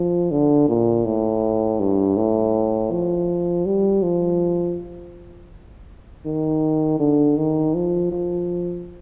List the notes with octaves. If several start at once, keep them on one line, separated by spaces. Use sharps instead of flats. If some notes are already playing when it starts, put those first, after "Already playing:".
Already playing: F3
D3
A#2
A2
G2
A2
F3
G3
F3
D#3
D3
D#3
F3
F3